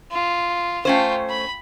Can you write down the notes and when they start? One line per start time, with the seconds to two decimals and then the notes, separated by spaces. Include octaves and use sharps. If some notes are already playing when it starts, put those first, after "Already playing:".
0.11 F4
0.85 A3 C#4 F4 C5 G5
1.30 B5